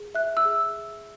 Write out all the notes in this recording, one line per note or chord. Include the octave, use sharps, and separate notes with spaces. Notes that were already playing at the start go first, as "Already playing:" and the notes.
Already playing: G#4
E5 F#6
E6
G#4